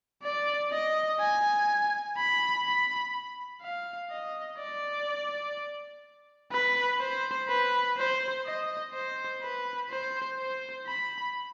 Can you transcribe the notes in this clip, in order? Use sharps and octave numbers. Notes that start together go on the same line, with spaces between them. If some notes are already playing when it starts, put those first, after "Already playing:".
D5
D#5
G#5
B5
B5
F5
D#5
D5
B4
C5
B4
C5
D#5
C5
B4
C5
C5
B5